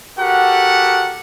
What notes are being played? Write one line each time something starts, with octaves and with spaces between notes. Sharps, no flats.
F#4 G4 A4 A#4 F#5